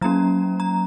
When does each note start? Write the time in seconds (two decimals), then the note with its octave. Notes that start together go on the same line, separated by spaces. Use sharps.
0.01 F#3 A#3 C#4 A#5
0.60 A#5